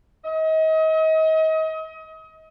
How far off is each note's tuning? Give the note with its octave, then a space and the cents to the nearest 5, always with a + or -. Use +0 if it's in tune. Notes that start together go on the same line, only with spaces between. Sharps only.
D#5 +35